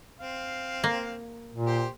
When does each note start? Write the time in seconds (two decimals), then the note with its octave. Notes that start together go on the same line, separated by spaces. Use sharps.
0.20 C4 F5
0.84 A#3
1.54 A#2
1.66 G4 C5